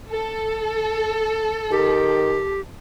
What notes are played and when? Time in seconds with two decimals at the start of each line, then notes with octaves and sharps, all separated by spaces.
0.10 A4
1.71 D#3 G4